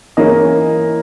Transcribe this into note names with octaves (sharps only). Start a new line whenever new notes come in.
E3 A#3 C#4 D#5